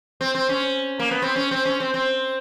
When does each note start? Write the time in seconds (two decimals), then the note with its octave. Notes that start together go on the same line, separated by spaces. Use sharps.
0.21 C4
0.35 C4
0.49 C#4
0.99 A#3
1.11 B3
1.22 C4
1.36 C#4
1.51 C4
1.65 C#4
1.80 C4
1.94 C4